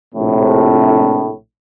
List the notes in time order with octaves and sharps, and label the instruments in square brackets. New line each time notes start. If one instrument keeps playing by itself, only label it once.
[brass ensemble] A#1 A2 C3